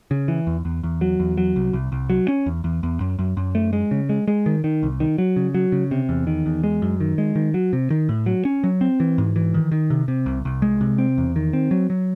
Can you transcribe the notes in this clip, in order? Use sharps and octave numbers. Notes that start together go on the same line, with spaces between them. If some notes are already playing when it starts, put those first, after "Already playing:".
C#3
E3
E2
E2
E2
F#3
E2
F#3
C2
C2
C2
F#3
C#4
E2
E2
E2
F#2
F#2
F#2
A3
G#3
C#3
G#3
G#3
D#3
D#3
C2
D#3
F#3
C#3
F#3
C#3
C3
E2
D#3
E2
G#3
F#2
D#3
G#3
D#3
F#3
C3
D#3
A2
F#3
C#4
F#3
C4
E3
G#2
E3
D#3
D#3
C3
C3
C2
C2
G#3
C3
C4
E2
D#3
C4
F#3
F#3